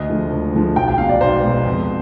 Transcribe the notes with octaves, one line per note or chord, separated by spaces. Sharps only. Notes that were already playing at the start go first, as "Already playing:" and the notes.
Already playing: D2 D#5
D3 F3 G#3
D2
D3 F3 G#3
B1 G5
G5
B2 G#3 F5
D5
B1 C5
B2 G#3
F2